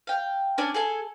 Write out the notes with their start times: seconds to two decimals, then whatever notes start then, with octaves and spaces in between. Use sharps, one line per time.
0.07 F5 G5
0.58 C#4 D4 D5 G#5
0.74 G#4 A4 G#5